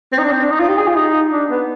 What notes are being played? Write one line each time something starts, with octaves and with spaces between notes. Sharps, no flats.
C4
D#4
D4
C4
D4
D#4
F4
G4
G#4
F4
D#4
D4
B3